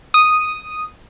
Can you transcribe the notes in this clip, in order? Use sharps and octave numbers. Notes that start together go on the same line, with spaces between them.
D#6